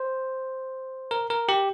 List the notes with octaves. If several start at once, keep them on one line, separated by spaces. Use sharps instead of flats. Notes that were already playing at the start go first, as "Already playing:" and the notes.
Already playing: C5
A#4
A#4
G4